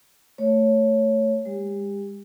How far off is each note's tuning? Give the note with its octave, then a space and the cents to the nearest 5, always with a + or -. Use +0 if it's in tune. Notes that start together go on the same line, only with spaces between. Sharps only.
A3 +10 C#5 +0
G#3 -40 G4 +20